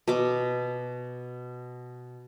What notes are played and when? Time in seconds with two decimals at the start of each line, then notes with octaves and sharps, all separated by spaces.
0.08 B2 D6